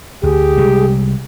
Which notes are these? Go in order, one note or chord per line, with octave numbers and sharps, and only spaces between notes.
D2 G4 G#4
C2 G3 G#3